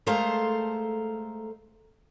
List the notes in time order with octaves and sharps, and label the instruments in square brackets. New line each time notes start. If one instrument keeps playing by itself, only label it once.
[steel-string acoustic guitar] G#3 A3 A4 A#4 C5 F5